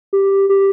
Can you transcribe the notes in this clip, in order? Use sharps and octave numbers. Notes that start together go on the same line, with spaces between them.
G4
G4